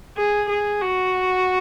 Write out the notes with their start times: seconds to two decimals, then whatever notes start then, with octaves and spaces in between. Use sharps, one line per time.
0.17 G#4
0.49 G#4
0.81 F#4